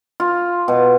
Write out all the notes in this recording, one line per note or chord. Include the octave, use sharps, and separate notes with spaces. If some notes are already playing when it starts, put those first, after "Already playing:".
F4
B2